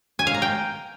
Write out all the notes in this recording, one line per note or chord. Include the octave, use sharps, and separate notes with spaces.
G#5
F5
A#5
G5